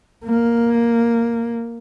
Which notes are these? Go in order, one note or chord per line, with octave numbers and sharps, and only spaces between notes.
A#3